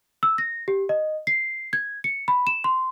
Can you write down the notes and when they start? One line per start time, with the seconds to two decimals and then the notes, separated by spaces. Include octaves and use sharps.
0.23 E6
0.38 A#6
0.68 G4
0.89 D#5
1.27 C7
1.73 G#6
2.04 C#7
2.28 B5
2.47 E7
2.64 C6